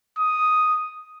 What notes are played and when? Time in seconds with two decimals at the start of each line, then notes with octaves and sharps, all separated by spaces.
0.19 D#6